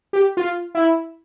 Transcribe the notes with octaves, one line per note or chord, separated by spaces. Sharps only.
G4
F4
E4